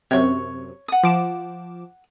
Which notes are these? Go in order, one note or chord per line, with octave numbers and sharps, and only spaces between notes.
F#2 C3 C#5 C#6
F#5 D#6
F3 D6 E7